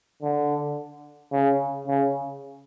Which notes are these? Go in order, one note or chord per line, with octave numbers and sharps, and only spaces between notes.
D3
C#3
C#3